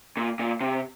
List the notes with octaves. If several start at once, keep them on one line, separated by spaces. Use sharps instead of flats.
A#2
A#2
C3